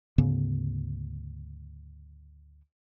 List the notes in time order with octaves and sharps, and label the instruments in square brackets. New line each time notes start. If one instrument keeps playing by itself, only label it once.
[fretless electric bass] D2 G#2 C#3 B3